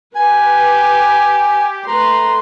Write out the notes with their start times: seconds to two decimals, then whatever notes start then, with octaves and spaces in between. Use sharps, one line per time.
0.15 G4 B4 G#5
1.88 A3 B4 A#5 C6